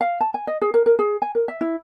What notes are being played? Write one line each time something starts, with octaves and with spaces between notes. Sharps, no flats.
F5
A5
G#5
D#5
G#4
A#4
A#4
G#4
G#5
A#4
E5
E4